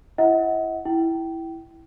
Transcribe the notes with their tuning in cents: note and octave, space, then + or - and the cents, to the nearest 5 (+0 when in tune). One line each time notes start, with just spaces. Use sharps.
E4 +20 D#5 +45 F#5 +0
E4 +0 G5 -20